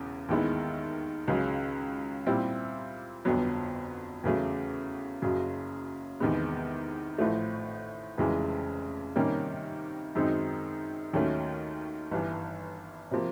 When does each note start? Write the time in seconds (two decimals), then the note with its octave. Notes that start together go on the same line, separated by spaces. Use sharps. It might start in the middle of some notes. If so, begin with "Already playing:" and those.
Already playing: E1 E2 C#3
0.29 D#2 D#3 G#3 B3 E4
1.28 C#2 C#3 F#3
2.26 A#2 G3 C4 E4
3.25 G1 F2 D3 F#3 B3
4.24 E2 C#3 F#3 A3
5.22 F#1 F#2 C#3 F#3
6.20 E2 C3 D#3 G#3 B3
7.18 A1 A2 F3 A3
8.18 F1 F2 C#3 E3 G#3
9.16 C3 D#3 G3 A#3 C#4
10.15 F#2 D#3 G#3 C4 D#4
11.13 D#2 D#3 F#3 A3 C#4
12.11 G1 G2 E3
13.11 C3 F3 A#3